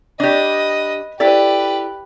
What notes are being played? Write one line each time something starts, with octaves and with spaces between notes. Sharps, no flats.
D4 G4 B4 D#5
E4 G4 A4 B4 D5